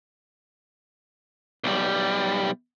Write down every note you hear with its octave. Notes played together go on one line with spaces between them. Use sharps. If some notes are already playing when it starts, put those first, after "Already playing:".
B1 G3